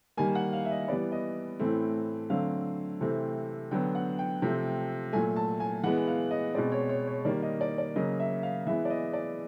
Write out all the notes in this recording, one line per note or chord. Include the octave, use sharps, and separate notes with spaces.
D#3 G3 A#3 G#5
F#5
F5
E5
D#5
E3 G3 B3 D5
D#5
A2 E3 A3 C4
D3 F#3 A3 C4 F5
C3 E3 A3 C4
D3 F#3 B3 G5
F#5
G5
C3 F3 A3 C4
A#2 F#3 A3 G#5
A5
G#5
E3 G#3 B3 F#5
F5
D#5
B2 G#3 C4 D5
C#5
C#5
C#5
D#3 G3 A#3 D5
D#5
D5
D5
C#3 F#3 A#3 D#5
E5
F5
E3 G#3 B3 E5
D5
D#5
D5